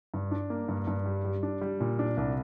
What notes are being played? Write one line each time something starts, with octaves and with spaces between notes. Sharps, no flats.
G2
D4
A#3
G2
G2
G3
G3
D4
G3
A#2
D4
C2